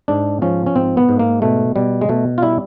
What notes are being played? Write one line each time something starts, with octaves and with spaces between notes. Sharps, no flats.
G#2 D4
F3 C#4
C#4
G#2 C4
B3
G#2
A#3
B2 A3
B2 G3
G#3
B2 A3
F4
G3 E4